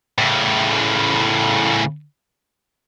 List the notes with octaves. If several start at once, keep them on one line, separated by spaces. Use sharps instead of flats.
A2 C#3